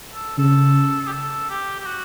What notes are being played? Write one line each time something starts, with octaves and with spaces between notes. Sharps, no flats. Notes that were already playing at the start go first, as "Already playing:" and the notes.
A4
C#3 A4
G4
A4
G4
G4
F#4